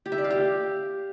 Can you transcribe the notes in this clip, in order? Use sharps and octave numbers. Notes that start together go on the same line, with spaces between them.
G4
E5
D5
F5
G4